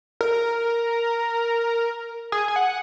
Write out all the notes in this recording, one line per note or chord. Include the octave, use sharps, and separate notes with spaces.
A#4
G#4
G#5
F#5